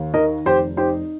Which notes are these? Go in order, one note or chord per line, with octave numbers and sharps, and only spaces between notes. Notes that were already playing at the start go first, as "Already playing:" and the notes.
Already playing: D#2
D#3 A#4 D#5
F1 G4 C5
D#4 G4 C5